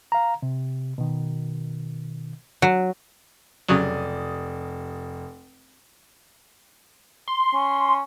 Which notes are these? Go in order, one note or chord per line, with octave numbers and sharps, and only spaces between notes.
F5 A#5
C3
B2 D#3
F#3
F1 C#3 F#3 D5 D#6
C6
C#4